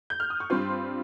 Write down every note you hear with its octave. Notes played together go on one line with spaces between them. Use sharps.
G6
F6
D#6
C#6
G2 G3 C4 F4 C6